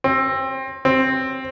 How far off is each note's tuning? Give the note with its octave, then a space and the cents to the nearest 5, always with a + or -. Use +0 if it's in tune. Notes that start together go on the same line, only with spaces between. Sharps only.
C4 +25
C4 +10